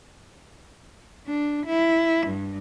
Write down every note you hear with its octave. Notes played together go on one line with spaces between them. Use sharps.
D4
E4
G2